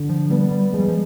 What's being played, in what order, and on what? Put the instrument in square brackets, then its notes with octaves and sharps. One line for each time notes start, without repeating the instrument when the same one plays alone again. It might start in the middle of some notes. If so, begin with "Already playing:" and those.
Already playing: [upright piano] D3
[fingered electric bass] F3
[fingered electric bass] G3 [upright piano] B3
[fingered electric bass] G3
[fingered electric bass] F3 [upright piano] G#3
[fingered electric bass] G3
F3